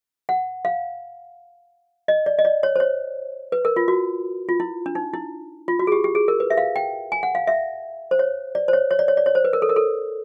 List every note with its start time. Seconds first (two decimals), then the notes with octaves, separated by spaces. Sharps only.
0.29 F#5
0.65 F5
2.08 D#5
2.26 D5
2.39 D#5
2.45 D5
2.63 C#5
2.76 C5
2.80 C#5
3.52 B4
3.65 A#4
3.76 F4
3.88 F#4
4.49 F4
4.60 E4
4.86 D4
4.95 D#4
5.14 E4
5.68 F4
5.79 F#4
5.87 G#4
5.92 G4
6.04 G4
6.15 G#4
6.28 A#4
6.40 B4
6.50 E5
6.57 F5
6.76 G5
7.12 G#5
7.23 F#5
7.35 F5
7.47 E5
8.11 C5
8.19 C#5
8.55 D5
8.68 C5
8.73 C#5
8.91 C#5
8.99 D5
9.08 C#5
9.17 D5
9.26 C#5
9.35 C5
9.45 B4
9.53 A#4
9.62 A4
9.69 A#4
9.76 A4